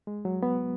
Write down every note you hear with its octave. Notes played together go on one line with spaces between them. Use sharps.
G#3
F#3
B3